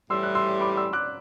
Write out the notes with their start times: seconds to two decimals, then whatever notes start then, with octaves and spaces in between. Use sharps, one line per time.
0.10 A2 E3 G3 C6 E6
0.23 F#6
0.35 C6 E6
0.61 B5 D6
0.77 C6 E6
0.93 D6 F#6